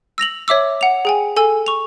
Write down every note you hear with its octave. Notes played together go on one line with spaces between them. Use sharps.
E6 A#6 F7 F#7
C#5 E5 D6 E6
F#5 F7
G#4 G5 G#5
A4 G#5 E6
C#6 F7